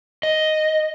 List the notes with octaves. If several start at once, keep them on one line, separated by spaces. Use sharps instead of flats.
D#5